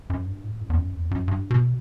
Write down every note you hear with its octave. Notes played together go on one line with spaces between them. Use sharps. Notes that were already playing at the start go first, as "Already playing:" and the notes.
F#2
G2
A2
F#2
E2
F#2
E2
F#2
G2
B2